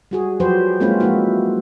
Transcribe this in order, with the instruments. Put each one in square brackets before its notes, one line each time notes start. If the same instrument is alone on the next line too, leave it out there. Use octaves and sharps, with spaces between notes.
[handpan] G3 F#4 G#4
F3 F#3 F#4 G4 B4 C5
G#3 A#3 C4 C#4 F4 B4
F3 G#3 A#3 E4 F#4